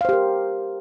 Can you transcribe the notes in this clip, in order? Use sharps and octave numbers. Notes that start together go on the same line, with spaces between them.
G4 A#4 C5 F5